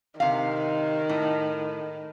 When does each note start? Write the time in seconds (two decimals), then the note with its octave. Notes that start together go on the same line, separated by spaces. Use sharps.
0.20 C3 D#3 F5
1.09 A2